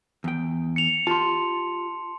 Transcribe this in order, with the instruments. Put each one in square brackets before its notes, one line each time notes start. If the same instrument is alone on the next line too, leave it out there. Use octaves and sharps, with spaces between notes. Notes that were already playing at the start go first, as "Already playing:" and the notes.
[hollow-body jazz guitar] E2 G5
[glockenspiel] C#7 F7
[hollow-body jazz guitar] F4 G4 [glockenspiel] A5 C6